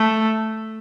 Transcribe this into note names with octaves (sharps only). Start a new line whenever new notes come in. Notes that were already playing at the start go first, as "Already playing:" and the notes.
Already playing: A3